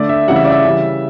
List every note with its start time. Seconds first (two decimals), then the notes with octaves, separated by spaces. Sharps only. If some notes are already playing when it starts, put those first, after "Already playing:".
Already playing: D3 A3 D5
0.09 E5
0.27 C#3 E3 G3 F#5
0.36 E5
0.45 D5
0.52 E5
0.65 C#3 E3 G3